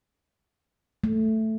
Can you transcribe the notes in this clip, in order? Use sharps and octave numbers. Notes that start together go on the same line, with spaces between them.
A3